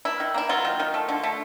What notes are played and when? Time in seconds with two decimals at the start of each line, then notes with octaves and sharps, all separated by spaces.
0.05 A#3 E4
0.20 D#3
0.34 A#3 E4
0.49 F#3 F4
0.65 D#3
0.80 D#3
0.94 A3
1.09 D3
1.23 A3